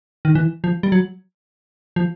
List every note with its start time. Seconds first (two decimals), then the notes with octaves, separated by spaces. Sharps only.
0.25 D#3
0.35 E3
0.64 F3
0.83 G3
0.92 F#3
1.96 F3